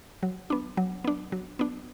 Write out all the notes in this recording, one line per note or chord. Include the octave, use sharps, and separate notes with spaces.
F#3
B3 D4
F#3
B3 D4
F#3
B3 D4